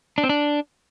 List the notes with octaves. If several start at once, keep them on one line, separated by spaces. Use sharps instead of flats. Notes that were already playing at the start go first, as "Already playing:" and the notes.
D4
C4
D4